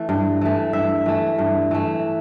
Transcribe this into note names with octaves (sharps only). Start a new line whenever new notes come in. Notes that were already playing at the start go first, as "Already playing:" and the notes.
Already playing: E3 A3
G2
E3 A3
G2 E5
E3 A3
G2
E3 A3